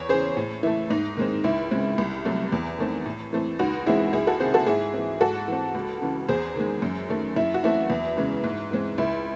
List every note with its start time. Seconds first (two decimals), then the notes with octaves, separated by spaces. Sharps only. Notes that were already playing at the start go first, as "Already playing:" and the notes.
Already playing: E2 C#5
0.09 C#3 E3 G#4 C5
0.37 A2
0.63 E3 A3 E4
0.90 G#2 D#4
1.17 D#3 G#3 C4
1.44 C#2 E4
1.71 C#3 G#3 C4
1.98 C2
2.25 C3 F#3 A3
2.52 E2
2.78 D#3 A3 C4
3.05 A2
3.33 E3 A3 C4
3.59 C#2 D#4 F#4
3.86 C#3 E3 G#3 C4 E4 G#4
4.13 C#2 E4 G#4
4.27 F#4 A4
4.40 C3 D#3 G#4 C5
4.54 F#4 A4
4.67 G#2 E4 G#4
4.94 E3 C4
5.20 G#2 F#4 A4
5.48 E3 C4
5.75 C#2
6.01 C#3 E3
6.29 E2 G#4 C5
6.56 D#3 G#3
6.82 F#2
7.09 D#3 A3
7.36 F#2 E4
7.54 F#4
7.63 E3 A3 C4 E4
7.90 E2
8.17 C#3 E3 G#3
8.44 G#2
8.71 E3 G#3 C4
8.98 C#2 E4